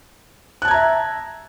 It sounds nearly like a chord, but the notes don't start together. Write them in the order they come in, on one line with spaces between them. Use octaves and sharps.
F#6 A5 G#6 A#5 E5